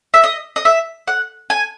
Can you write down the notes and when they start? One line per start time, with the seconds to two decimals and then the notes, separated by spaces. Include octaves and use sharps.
0.14 E5
0.24 D#5
0.56 D#5
0.65 E5
1.08 F#5
1.50 G#5